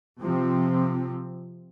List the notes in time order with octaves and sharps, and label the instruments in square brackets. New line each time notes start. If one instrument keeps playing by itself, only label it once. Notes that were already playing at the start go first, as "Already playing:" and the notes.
[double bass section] C3 F3 C4